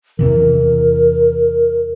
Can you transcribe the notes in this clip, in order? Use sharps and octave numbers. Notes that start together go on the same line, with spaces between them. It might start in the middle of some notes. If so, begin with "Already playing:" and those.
E2 C3 E3 A#4